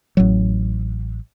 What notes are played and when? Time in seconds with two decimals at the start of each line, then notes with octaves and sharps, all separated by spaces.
0.17 A1 F#3